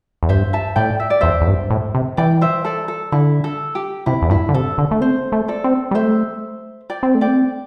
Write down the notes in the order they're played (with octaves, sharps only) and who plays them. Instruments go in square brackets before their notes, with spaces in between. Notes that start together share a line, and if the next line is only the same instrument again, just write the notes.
[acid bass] E2
[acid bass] G2 [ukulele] C5 E5
[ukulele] E5 A5
[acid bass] A2 [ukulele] D5 G5
[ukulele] E5
D5
[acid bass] E2 [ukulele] C5 E5
[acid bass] E2
G2
A2
C3
[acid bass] E3 [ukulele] D5 G5
[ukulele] C5 E5
A4 D5
A4
[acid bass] D3 [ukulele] E4
[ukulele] A4
G4
[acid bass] C3 [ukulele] E4
[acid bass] E2
[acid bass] G2 [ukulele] E4
[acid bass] D3
[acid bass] C3 [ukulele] A4
[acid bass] D3
A3
[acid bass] C4 [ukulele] C5
[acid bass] A3
[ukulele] A4 D5
[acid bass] C4
G3
[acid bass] A3 [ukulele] C5 E5
[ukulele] D5 G5
[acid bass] C4
A3
[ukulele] D5 G5
[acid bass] C4